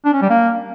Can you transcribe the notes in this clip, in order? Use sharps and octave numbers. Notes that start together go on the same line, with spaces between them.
D4
C#4
G3
A#3